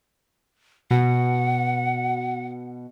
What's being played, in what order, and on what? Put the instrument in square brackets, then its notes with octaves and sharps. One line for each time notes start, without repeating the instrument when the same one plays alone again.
[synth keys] B2 [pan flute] F#5